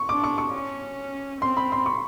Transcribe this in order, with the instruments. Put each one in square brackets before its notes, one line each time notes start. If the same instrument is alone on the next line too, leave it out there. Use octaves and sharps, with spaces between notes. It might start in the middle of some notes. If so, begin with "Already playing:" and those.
Already playing: [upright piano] C#6
[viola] D4 [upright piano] D6
[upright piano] C#6
C#6
[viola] C#4
[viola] C4 [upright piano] C6
[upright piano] B5
C6
C#6